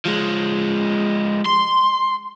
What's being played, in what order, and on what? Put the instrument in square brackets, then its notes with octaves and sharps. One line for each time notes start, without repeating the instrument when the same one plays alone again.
[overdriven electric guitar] F3 G#3
C6